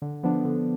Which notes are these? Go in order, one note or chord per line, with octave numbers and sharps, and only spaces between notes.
D3
F3 B3 D4
D3